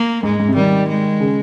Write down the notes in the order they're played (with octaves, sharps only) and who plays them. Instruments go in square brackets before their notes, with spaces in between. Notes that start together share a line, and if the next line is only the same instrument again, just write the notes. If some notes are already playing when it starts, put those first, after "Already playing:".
Already playing: [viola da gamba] A#3
[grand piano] G#2 [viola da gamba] G#3
[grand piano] G#2
C3
[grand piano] D#3 [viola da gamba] G3
[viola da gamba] G#3
[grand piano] C#3